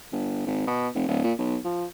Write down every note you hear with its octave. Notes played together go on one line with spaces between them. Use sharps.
G1
G#1
B2
F1
D1
A#2
B1
F3